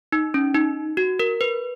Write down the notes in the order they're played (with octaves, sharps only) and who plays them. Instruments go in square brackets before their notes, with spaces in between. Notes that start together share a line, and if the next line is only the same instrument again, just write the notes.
[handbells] D#4
C#4
D#4
F#4
A#4
B4